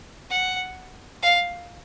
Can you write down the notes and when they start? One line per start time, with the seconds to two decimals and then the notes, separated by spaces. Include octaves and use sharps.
0.30 F#5
1.22 F5